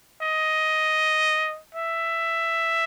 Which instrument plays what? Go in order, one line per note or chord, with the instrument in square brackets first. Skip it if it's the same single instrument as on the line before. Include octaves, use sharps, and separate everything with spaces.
[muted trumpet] D#5
E5